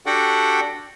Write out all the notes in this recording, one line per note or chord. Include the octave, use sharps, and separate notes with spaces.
D4 F#4 G4 A4 F#5 G5